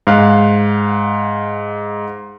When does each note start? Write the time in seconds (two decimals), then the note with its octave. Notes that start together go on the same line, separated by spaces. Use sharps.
0.07 G#2 F5 F#6